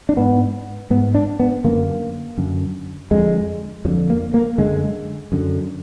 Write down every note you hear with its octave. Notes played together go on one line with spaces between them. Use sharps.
D4
G#2 B3
G#2 B3
D4
B3
F#2 D3 A#3
F#2 D3
F2 D3 G#3
F2 D3 F#3
A#3
A#3
F#2 D3 G#3
F#2 D3